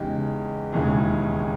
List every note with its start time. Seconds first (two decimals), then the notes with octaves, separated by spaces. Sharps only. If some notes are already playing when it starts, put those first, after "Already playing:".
Already playing: E2 C#3 G#3 D#4 G4
0.72 E1 D#2 C#3 E3 G#3